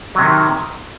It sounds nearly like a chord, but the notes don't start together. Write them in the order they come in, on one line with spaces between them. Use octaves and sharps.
F#3 C3 D#3